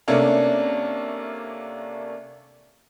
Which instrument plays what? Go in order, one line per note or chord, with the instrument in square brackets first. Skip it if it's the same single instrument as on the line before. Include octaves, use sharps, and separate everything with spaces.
[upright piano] C3 A3 A#3 C#4 D4